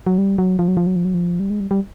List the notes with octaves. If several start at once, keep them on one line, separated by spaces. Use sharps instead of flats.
F#3
G3
F#3
F3
F#3
F3
F#3
F3
F#3
F3
G3
G#3
G3
G3